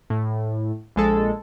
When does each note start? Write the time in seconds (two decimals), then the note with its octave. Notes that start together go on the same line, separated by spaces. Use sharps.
0.10 A2
0.96 A#1 G#3 A4